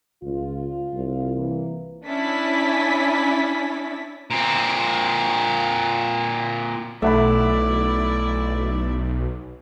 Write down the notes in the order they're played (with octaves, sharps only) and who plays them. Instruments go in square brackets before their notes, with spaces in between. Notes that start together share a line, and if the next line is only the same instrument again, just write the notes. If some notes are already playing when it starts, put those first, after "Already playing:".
[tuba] C#2 [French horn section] F4
[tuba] C2
[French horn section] E3 A#3
[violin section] C#4 D4 E4 A6 B6
[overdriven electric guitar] A#2 C4
[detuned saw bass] B1 [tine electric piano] A3 [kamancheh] E4 D5 [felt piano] E5 F#5 B5